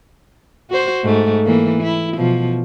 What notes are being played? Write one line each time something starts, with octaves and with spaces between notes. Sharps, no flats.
F#4 C5
G#2 A3
E3 A#3
E4
B2 F3